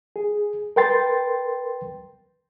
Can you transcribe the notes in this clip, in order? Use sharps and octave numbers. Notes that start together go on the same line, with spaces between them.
G#4
A#4 B4 G5 C6 A6